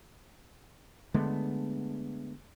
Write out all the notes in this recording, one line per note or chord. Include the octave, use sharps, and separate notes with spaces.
D3 G#3 A3 B3